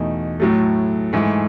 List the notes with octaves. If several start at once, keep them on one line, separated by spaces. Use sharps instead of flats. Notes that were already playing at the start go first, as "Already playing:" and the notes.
Already playing: E2 B2 A3 D#4
A2 F#3 A3
G#2 E3 A3 E4